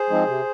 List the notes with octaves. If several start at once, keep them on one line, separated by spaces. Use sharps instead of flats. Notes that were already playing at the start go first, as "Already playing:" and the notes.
Already playing: G#4 C5
F3 G#3 C4 D#4
C3